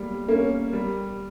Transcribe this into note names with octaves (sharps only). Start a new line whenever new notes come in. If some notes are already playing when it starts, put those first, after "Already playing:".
Already playing: G3 A#3
A#3 C#4
G3